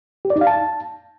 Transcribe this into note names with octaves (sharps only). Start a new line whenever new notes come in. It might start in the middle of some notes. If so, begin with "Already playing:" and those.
G4
D5
D#4
F5
A5